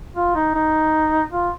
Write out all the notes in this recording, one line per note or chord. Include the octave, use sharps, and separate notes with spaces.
F4
D#4
D#4
F4